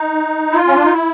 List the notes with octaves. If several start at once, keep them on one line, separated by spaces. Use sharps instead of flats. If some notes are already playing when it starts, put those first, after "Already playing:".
Already playing: D#4
E4
F4
C#4
D4
D#4
E4